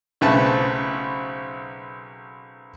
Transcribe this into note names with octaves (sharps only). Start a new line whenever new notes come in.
B1 C#3 A3 C4 B4 A5